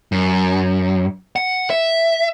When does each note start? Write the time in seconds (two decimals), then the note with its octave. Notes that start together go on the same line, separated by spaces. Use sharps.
0.12 F#2
1.36 F#5
1.70 E5